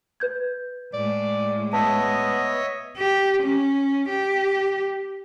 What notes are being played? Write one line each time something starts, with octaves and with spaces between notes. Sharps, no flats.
B4 G6 G#6
A2 G#3 D5
B3 C#5 D#5 E5 A5
G4
C#4
G4